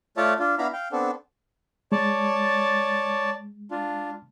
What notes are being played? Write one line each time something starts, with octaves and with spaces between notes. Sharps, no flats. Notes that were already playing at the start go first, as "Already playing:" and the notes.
A3 F4 C#5 D5 E5 A5
D4 F4
B3 D4 E4 F5 A#5 B5
F5 G5
B3 C4 D4 A4
G#3 C#5 D5 A5
D4 F4